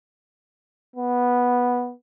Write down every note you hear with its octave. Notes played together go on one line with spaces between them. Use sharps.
B3